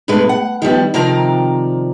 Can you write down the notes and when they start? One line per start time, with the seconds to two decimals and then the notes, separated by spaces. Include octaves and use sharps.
0.08 G2 B2 G#3 A3 B4
0.29 F#5
0.62 D#3 F3 G3 B3
0.94 C3 D#3 F3 D5 A#5